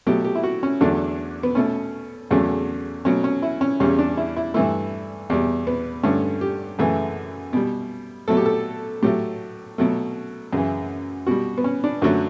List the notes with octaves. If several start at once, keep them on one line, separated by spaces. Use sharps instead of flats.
B2 F#3 A3 G4
G4
E4
F#4
C#4
E2 D3 F#3 A3 D4
B3
B2 A3 C#4
E2 C#3 F#3 A3
B2 F#3 A3 C#4
C#4
E4
C#4
E2 C#3 G3 C#4
D4
E4
E4
G2 E3 A3 E4
E2 B2 G3
B3
G2 D3 A3 C#4
G4
F#2 C#3 E3 A3
B2 G3
B2 F#3 A3 A4
G4
A4
A2 F#3 A3 G4
B2 F#3 A3
F#2 C#3 E3
B2 G3 F#4
B3
C#4
D4
F#2 D3 F#3 A3 F#4